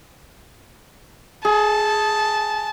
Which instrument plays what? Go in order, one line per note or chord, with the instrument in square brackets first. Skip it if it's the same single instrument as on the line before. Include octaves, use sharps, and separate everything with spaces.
[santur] G#4 [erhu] A5